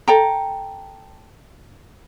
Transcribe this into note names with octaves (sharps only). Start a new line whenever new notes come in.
A4 G5 A#5